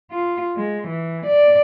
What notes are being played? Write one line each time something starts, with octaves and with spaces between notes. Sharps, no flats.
F4
G#3
E3
D5